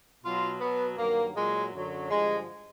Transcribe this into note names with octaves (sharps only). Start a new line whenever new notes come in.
B2 F#3 F4
B2 F#3 B3
G2 D#3 F#3 A#3
A#2 F#3 G#3
F#2 D3 F#3
G2 D3 F3 G#3